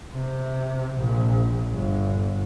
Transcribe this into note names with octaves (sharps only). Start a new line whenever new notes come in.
C3
A#1
G1